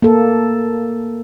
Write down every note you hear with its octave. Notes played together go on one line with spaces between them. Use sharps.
A#3 A4